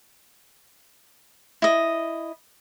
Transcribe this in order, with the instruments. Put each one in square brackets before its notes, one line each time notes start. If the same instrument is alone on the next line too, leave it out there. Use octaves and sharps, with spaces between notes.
[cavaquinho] E4 D#5